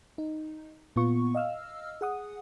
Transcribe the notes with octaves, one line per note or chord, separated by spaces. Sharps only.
D#4
A#2 B3 F4 C#6
D#5 F5 E6 F6
G#4 F#5 D#6